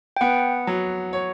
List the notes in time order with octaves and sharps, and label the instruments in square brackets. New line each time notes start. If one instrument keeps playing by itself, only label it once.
[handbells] G5
[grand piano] B3 [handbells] F#5
[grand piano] F#3
C#5